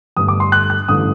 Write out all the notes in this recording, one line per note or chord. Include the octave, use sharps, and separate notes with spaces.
G1 G2 D3 A3 D#6
D6
C6
F#6
F#6
A1 G2 D3 D#6